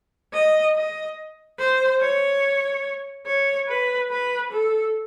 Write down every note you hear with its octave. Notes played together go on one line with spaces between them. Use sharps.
D#5
D#5
C5
C#5
C#5
B4
B4
A4